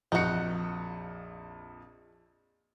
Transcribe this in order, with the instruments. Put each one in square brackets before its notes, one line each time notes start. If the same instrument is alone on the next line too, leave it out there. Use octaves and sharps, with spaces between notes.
[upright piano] A#1 F2 C#7 [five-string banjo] D#4 F#4